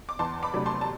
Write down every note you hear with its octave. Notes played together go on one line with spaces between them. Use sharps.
D6
E2 A5 C6
B5 D6
C3 F#3 A3 D4
A5 C6
A5